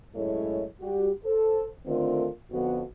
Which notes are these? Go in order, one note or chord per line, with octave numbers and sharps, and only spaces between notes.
F#2 A2 G#3 A3 E4 C#5
G3 F#4 G4
A4 C5
D3 D#3 A3 C4 F4 A#4
F2 D3 B3 F#4